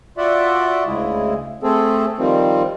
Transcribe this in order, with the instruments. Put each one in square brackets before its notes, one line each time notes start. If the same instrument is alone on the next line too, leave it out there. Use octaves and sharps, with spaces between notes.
[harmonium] F4 F#4 D5 E5 F#5
D2 C#3 G#3 E4 G#4
A3 C4 G#4 A4
D#3 F3 G3 C4